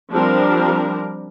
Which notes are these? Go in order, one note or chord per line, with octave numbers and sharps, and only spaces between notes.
F3 G3 C4 D4 A#4